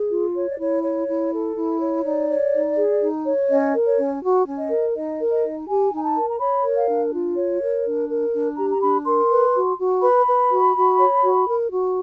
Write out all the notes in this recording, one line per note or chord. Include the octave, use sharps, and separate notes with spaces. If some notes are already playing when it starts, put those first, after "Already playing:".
Already playing: G#4
F4
C#5
D5
E4 C#5
C#5
E4
A4
E4
C#5
D#4 D5
C#5
D#4
G#4
D#4
C#5
C#4 D#5
A#4
C#5
C#4
F#4
C#4
D#5
A#4
D#4 D#5
A#4
D#5
D#4
G4 G#5
D#4 G#5
A5
A#4
A#5
C#5 B5
A#4
F5
D4
F4
C#5
A#4
D4
A#4
D4
G4 A#5
A#5
D4 B5
A#4 C6
B4
F#4
F#4
B4 B5
B4
F#4
F#4
C#5
F#4
A#4
F#4